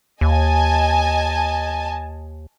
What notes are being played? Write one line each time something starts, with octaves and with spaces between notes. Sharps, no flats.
D#2 D#5 G#5 A5